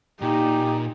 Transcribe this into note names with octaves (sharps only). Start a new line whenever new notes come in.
A#2 D#4 G4